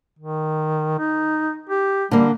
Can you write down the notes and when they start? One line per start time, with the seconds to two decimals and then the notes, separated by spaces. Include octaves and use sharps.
0.19 D#3
0.99 D#4
1.69 G4
2.11 D3 G3 A#3